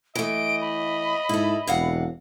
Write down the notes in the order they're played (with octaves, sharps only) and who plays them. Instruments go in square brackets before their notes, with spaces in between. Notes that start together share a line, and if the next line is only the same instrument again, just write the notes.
[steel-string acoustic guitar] E3 A3 [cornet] D#5 [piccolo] D7
[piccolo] B5
[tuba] G#2 [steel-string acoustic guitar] E4 A4
[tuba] E1 [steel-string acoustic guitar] C3 F5 F#5